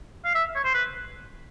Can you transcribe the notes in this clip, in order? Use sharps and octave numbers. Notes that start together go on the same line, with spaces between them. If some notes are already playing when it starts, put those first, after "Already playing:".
F5
E5
C#5
C5
B4